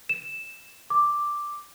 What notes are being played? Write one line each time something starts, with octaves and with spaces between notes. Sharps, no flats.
E7
D6